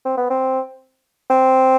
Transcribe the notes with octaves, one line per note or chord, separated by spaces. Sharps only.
C4
B3
C4
C4